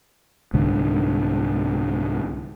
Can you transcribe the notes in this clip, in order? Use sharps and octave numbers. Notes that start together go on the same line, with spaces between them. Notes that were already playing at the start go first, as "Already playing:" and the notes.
C2 G#2 D3